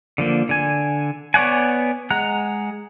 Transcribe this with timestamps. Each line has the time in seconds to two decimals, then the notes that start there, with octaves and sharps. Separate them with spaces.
0.18 D3 F3 A#3
0.49 D3 G#5
1.34 B3 C#5 D5 F#5 G#5
2.10 G#3 F#5 A#5 F#6